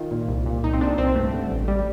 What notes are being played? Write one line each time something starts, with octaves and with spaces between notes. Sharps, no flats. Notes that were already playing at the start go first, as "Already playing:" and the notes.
Already playing: D#3 F4
A#2
C2
A#2
C2 D#4
C4
A#2 D4
C2 C4
G2 A3
D3
A1
A1 G3